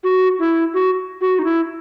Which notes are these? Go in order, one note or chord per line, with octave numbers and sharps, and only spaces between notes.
F#4
E4
F#4
F#4
D#4
E4